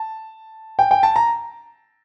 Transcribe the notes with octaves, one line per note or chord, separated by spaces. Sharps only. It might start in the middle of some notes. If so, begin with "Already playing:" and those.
Already playing: A5
G5
G5
A5
A#5